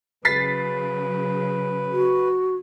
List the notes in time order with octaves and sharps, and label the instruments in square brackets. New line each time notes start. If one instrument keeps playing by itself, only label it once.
[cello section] C#3 F#3 [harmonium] B4 [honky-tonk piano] A6 B6 C7
[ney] F#4